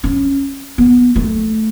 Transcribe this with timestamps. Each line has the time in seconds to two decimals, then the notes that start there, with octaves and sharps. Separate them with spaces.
0.04 C#4
0.78 B3
1.16 A3